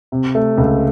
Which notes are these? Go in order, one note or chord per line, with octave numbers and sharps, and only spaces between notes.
C3
A3
C#2